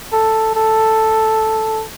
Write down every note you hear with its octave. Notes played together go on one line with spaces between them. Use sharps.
A4
A4